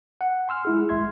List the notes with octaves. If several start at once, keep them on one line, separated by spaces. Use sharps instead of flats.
F#5
G#5 C6 E6 F6
G#3 E4 G#4
G#1 G#3 E5 C6 G#6